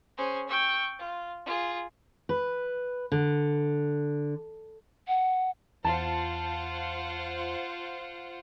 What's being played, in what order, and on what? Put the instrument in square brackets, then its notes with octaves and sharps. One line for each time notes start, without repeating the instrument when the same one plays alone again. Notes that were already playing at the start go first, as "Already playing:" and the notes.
[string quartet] C#4 G#4 C5
G5 C#6 E6
F4
F4 G#4
[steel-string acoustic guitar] B4
D3
[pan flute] F#5
[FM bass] E2 [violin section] F4 C5 F#5 [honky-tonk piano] A5